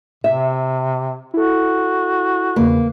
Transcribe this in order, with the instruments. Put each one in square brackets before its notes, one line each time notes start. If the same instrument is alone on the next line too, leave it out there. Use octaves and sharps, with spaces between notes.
[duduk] C3 [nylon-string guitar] E5
[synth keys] E4 A4 [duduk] F#4
[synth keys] E2 C#3 B4 [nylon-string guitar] A#3